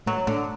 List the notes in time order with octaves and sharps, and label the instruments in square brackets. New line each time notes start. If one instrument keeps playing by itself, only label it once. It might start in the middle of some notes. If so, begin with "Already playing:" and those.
[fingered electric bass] A2 A3 [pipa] F#3
[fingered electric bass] A2 A3 [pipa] D3